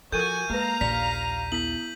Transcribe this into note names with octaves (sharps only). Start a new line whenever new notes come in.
F3 F#4 A4 A#4 G#5 G6 D#7
G#3 A#3 B4 F5 A#5
A#1 D#2 D5 B6
B3 E4 B6 F#7